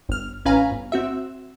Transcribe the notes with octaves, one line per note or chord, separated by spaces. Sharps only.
G1 F6
A1 C#4 B4 F5 G#5 A#5
G1
C4 F#4 E5